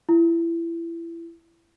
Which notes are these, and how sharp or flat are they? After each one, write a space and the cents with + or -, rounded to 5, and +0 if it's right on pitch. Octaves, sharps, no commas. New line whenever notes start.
E4 +25